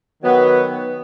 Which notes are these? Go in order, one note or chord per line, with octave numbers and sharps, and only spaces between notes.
D#3 F#3 B3 F#4